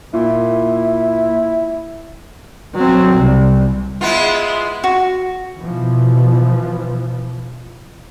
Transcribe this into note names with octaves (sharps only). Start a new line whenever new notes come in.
A#2 E4
F#3 C4
C2
G#3 B3 E4 F4
F#4
B2 E3 F3